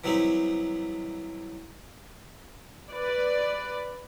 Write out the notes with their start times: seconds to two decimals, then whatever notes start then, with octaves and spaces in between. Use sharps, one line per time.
0.04 E3 F#3 G3 C4 D#4 E4
2.91 B4 D5